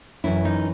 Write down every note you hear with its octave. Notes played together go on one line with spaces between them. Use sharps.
F#2 E3 E4
D#4